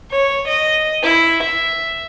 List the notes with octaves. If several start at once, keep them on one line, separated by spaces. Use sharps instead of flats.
C#5
D#5
E4
E5